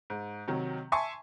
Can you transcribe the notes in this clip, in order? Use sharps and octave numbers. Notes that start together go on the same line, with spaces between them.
G#2
C3 D#3 F#3
E5 G#5 A5 C6 C#6